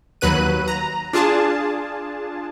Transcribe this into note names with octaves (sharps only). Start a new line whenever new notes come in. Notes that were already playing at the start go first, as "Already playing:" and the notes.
D#2 F#3 B4 F#6 D#7
A#5
D4 F4 G#4 A5